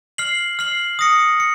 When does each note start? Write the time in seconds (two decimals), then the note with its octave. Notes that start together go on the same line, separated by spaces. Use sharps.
0.18 F6 C7 F#7
0.59 F6 C7 F#7
0.99 D#6 A#6 C#7
1.40 C#7